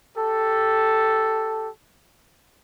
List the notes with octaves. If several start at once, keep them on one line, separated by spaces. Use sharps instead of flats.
G4 A4